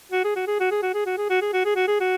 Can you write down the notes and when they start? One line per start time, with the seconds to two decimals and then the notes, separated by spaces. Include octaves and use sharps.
0.12 F#4
0.24 G#4
0.35 F#4
0.47 G#4
0.59 F#4
0.71 G#4
0.82 F#4
0.94 G#4
1.06 F#4
1.18 G#4
1.29 F#4
1.41 G#4
1.53 F#4
1.65 G#4
1.75 F#4
1.87 G#4
2.00 F#4